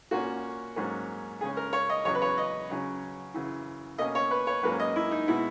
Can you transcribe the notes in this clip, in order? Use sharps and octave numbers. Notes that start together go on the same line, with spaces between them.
A#2 A#3 C#4 F#4
G#2 F#3 A#3 C#4
C#3 G#3 C#4 G#4
A#4
C#5
D#5
E2 C#3 F#3 C#5
B4
C#5
D#5
C#3 F#3 C#4
F#2 C#3 E3
B2 A#3 C#4 D#5
C#5
B4
C#5
G#2 F#3 A#3 C#4 B4
D#5
E4
D#4
B2 G#3 B3 E4